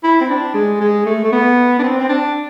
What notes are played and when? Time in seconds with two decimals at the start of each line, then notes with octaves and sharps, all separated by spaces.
0.03 E4
0.21 C4
0.29 D4
0.54 G#3
0.81 G#3
1.06 A3
1.24 A3
1.32 B3
1.79 D4
1.83 C4
2.00 C4
2.09 D4